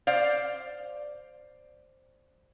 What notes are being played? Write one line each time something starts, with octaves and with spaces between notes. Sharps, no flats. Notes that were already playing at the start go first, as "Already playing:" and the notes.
C5 D5 F5